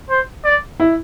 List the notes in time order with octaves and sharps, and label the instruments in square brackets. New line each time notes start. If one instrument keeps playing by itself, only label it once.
[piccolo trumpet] C5
D5
[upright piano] E4